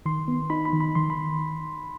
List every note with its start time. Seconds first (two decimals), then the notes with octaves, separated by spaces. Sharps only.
0.06 D#3 C6
0.28 B3
0.50 D#4 B5
0.65 B5
0.73 D#3
0.80 B5
0.95 D#3 C6
1.10 B5